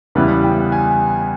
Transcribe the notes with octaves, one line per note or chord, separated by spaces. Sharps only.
E2 C#3 G3 B3 E4 B4
G5
G#5